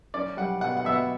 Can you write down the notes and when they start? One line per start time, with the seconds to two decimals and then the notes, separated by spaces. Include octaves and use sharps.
0.14 C#4 D5
0.37 G3 F#5
0.61 B2 F#5
0.77 F#5
0.85 B2 E5
0.92 F#5